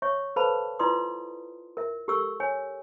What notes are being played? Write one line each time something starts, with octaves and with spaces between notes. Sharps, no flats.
C#5 E5 C#6
A4 B4 C5 F5 A5 B5
E4 F4 B4 D5 C6 D#6
A#4 E5
G4 A4 A#4 C#6 E6
C#5 G#5